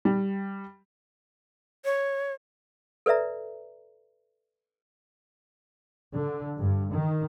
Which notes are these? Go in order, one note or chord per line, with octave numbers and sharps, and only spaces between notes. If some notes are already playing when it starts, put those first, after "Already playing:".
G3
C#5
A4 B4 D5 E5 A#5
D3
G2
D#3